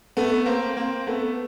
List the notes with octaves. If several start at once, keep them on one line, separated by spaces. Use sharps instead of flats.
A3 B3
A#3 C4
A#3 C4
A3 B3